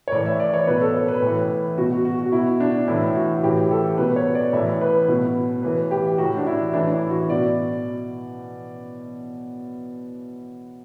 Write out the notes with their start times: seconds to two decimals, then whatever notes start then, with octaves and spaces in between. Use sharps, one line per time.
0.08 C#5
0.12 A2 E3 D5
0.26 E5
0.40 D5
0.54 C#5
0.67 B2 B4
0.81 A4
0.94 C#5
1.08 B4
1.22 A2 E3
1.78 B2 F#4
1.91 F#4
2.05 F#4
2.19 F#4
2.32 B2 E4
2.60 D4
2.88 A2 E3 E4
3.15 F#4
3.43 A2 E3 G4
3.71 A4
3.98 B2 B4
4.16 C#5
4.35 D5
4.53 A2 E3 E5
4.81 B4
5.08 B2
5.63 A2 E3 B4
5.91 G4
6.18 A2 E3 F#4
6.37 D4
6.46 E4
6.73 A2 E3 D4
6.93 E4
7.10 F#4
7.28 B2 D5